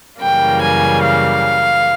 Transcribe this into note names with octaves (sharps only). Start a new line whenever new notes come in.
F#2 C#3 E3 G3 A#3 G5
G#5
F5